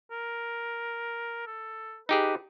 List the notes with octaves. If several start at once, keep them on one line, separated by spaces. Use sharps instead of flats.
A#4
A4
D#4 G4 G#4 B4